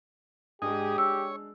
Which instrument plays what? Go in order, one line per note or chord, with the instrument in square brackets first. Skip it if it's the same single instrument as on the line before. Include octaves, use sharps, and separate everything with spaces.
[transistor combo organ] G#2 G#4 D#5 [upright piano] G#3 D4 [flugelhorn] G4
[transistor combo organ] C#5 [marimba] E6